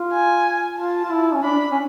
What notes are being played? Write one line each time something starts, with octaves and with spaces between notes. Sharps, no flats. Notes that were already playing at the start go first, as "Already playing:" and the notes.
Already playing: F4
G#5
F4 A5
F4
E4
C#4
D4 B5
C#4